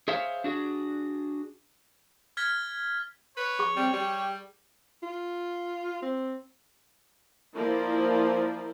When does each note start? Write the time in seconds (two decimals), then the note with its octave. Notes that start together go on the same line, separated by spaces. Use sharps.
0.08 G#4 C5 C#5 E5 F5
0.44 D4 F#4 G#4
2.37 F6 G#6 A6 B6 G7
3.37 B4 C#5
3.59 G#4 C#6
3.77 G3 C4
3.93 G3 G4
5.03 F4
6.03 C4
7.55 F3 A#3 E4 A#4 C5 D5